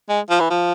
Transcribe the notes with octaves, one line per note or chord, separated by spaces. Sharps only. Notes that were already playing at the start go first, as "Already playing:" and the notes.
G#3
F3
E3
F3